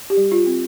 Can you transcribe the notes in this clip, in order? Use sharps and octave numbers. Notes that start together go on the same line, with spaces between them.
G4
G3
F4
C4